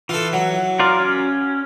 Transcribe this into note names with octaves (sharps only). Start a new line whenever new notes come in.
E3 F4 A4
F#3
F4 A#4 D5
C#4